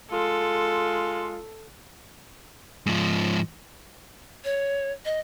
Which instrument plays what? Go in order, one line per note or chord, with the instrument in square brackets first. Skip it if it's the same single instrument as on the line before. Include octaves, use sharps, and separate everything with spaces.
[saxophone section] G#3 F4 [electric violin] A4
[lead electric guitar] G#2 F3
[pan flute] C#5
D#5